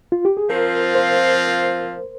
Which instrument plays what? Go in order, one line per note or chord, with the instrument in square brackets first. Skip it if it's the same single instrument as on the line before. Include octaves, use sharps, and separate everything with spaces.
[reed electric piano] F4
G4
G#4
[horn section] F3 C4 F4 [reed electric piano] A#4
[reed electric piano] C5